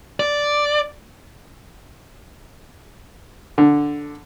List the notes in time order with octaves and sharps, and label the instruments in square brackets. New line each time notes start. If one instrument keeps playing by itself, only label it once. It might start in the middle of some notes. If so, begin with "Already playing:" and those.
[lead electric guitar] D5
[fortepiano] D3